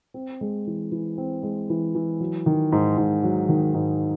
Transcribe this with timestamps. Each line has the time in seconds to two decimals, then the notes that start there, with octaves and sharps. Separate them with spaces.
0.14 C4
0.41 G#3
0.67 E3
0.92 E3
1.18 C4
1.43 G#3
1.70 E3
1.95 E3
2.20 F#3
2.46 D#3
2.72 G#2
2.98 G#2
3.23 F#3
3.49 D#3
3.74 G#2